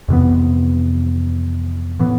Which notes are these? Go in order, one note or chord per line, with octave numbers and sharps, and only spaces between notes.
F2 C3 E3 B3
A2 E3 B3